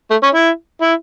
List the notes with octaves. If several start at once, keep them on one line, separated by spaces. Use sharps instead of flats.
A3
C#4
E4
E4